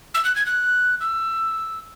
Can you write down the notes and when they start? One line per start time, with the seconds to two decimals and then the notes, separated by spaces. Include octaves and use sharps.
0.14 E6
0.25 F#6
0.36 G#6
0.46 F#6
1.00 E6